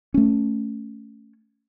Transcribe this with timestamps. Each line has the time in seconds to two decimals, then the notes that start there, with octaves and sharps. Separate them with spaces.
0.14 A3 C#4